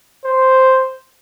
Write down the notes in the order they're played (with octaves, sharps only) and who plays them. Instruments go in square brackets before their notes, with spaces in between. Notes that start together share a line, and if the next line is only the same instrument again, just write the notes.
[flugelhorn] C5